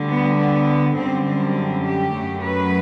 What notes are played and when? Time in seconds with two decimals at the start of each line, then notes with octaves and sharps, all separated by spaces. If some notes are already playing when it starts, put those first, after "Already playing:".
Already playing: D2 D3 G3
0.10 B3
0.39 B3
0.96 F#2 D3 G3 C4
1.26 C4
1.84 G4
2.13 F#2 F#3 A3
2.42 B4